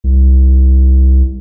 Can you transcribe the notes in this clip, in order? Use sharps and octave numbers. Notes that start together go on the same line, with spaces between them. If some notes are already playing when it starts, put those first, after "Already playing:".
C2